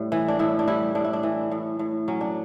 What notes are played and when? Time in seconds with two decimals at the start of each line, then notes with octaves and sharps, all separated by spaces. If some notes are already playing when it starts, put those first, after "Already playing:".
Already playing: A2 G3
0.12 E3
0.28 D4
0.39 A2 E4
0.59 D4
0.67 G3 E4
0.95 A2 D4
1.04 E4
1.13 D4
1.23 E3
1.51 A2
1.79 A2
2.08 F#3 C#4
2.21 D4